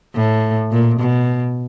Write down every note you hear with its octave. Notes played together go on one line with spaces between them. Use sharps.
A2
A#2
B2